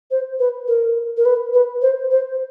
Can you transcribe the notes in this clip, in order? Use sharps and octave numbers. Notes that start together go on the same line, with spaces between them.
C5
B4
A#4
A#4
B4
B4
C5
C5